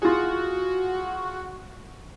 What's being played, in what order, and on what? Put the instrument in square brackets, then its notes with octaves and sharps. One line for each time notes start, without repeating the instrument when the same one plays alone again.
[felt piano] F4 G#4 [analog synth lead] F#4